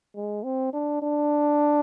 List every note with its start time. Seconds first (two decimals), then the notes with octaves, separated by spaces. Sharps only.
0.15 G#3
0.44 C4
0.73 D4
1.02 D4